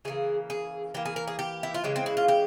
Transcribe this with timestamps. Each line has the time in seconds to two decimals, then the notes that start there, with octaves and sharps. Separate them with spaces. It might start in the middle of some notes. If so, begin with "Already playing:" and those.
0.05 C#3 E3 A#3 G#4
0.50 G#4
0.94 E3 A#3 G4
1.05 G#4
1.16 A#4
1.28 G#4
1.39 G4
1.63 E4
1.74 F4
1.84 C#3 E3 G#3 G4
1.96 C4
2.06 E4
2.17 F4
2.28 G4